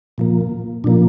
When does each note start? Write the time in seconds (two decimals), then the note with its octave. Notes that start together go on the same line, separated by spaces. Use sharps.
0.18 A#2 F3 A#3
0.84 A#2 F3 A#3 D4